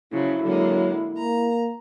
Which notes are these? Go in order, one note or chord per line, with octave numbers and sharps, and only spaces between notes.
C#3 F3 F#3 E4
D3 F#3 G#3 A#3
A#3 A#5